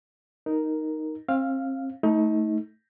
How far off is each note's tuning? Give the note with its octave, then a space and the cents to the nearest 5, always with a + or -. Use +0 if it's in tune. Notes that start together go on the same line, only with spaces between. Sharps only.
D#4 +0 A#4 +0
C4 +35 F5 +0
A3 +0 D#4 +30